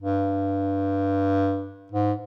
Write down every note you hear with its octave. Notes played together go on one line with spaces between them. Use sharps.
G2
G#2